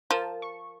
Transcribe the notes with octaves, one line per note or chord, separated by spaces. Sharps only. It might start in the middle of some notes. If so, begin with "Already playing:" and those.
F3 A#4 A5
C#6